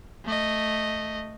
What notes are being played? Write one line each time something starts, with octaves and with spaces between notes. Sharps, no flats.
A3 D#5